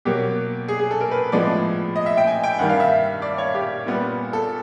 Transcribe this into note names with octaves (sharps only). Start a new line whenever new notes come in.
B2 F#3 A#3 G4
G#4
G#4
A4
A#4
B4
A2 F3 G#3 B3 D5
D#5
E5
G5
G#5
G5
G2 D#3 G3 F#5
F5
E5
D5
C#5
G4
A#2 G3 B3
A4